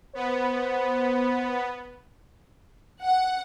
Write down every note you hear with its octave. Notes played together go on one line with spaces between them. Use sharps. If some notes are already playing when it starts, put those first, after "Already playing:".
B3 C5
F#5